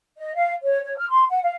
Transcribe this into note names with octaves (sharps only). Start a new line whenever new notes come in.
D#5
F5
C#5
C#5
F6
C6
F#5
F5